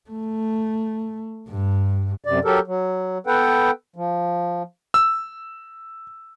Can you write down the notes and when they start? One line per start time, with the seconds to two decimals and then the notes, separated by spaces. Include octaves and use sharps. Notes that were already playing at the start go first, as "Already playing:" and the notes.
0.10 A3
1.49 G2
2.25 F#2 C3 D5
2.45 F#3 G4 A4 A#4
2.67 F#3
3.27 B3 A4 B4 F#5 G5
3.96 F3
4.94 E6